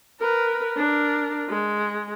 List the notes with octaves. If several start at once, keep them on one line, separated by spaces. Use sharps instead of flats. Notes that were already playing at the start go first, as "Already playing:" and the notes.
A#4 B4
D4 A#4
G#3